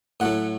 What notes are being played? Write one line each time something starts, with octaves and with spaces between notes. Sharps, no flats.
A2 F#3 A3 F#5